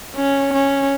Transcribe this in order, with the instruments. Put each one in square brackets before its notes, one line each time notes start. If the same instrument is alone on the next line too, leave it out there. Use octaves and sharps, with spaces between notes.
[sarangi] C#4
C#4